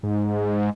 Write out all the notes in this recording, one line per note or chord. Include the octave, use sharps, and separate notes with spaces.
G#2